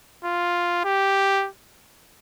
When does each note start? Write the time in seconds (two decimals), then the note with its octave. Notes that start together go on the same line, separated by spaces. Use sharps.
0.25 F4
0.85 G4